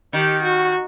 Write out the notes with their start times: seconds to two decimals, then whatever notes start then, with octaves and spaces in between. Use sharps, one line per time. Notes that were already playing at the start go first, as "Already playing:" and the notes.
0.13 D#3 G4
0.43 F#4